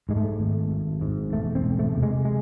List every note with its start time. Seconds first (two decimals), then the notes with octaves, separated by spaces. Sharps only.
0.09 G#2 G#3
0.17 A3
0.40 G#1
0.71 G#1
1.01 G#2
1.32 E1 A3
1.55 C4
1.64 E1
1.79 A3
1.95 C3
2.03 G#3
2.25 G#3